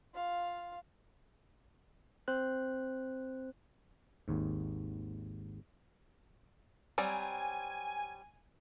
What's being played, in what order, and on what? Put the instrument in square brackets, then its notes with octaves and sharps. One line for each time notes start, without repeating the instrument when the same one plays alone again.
[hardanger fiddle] F4 F5
[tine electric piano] C4 C5 F#6
[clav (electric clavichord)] G#1 D#2 G#2
[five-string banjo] F#3 G3 C4 [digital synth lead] G#5